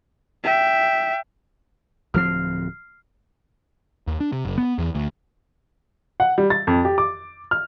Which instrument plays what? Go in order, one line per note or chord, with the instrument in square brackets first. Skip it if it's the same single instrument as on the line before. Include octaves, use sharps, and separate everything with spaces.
[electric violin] E5 G5
[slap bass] D1 F3 C4 [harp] F6 C7
[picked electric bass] D#2
D4
C3
F#1
B3
E2
D2
[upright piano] F#5
G3
A6
F2
G4
D6
F6